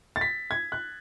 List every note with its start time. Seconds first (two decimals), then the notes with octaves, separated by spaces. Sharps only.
0.16 A6
0.21 B6
0.51 G#6
0.72 F#6